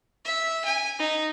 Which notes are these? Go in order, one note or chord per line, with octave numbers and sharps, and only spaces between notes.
E5
G#5
D#4